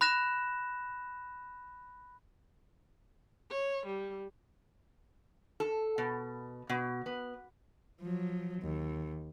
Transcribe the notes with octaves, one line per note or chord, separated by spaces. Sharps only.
B5 F#6 A#6 E7
C#5
G3
A4
B2
B2
B3
F3 F#3
D#2